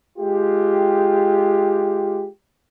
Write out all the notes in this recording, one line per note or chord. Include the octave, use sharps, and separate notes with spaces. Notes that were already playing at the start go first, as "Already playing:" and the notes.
G#3 F4 G4